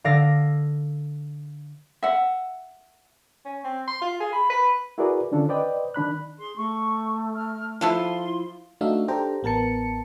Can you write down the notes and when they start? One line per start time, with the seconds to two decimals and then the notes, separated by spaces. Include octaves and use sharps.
0.04 D3 D5 F5 E6 A#6
2.03 E5 F#5
3.45 C#4
3.64 C4
3.88 C6
4.01 F4
4.20 G#4
4.33 B5
4.50 B4
4.98 E4 F#4 G#4 A#4 B4 D5
5.32 D3 D#3 C#4 D4 F4 A4
5.49 B4 C5 D5 D#5 G5
5.94 D#3 D4 B5 F#6
6.38 G#4 C6
6.56 A3 C#6
7.35 F6
7.81 F3 E4 A4 F5 C6
8.24 E4
8.81 A3 D4 D#4 F#4 E5 F5
9.08 D4 G4 A4 C5 G5 A#5
9.43 A1 B3 A#4 A5 C#7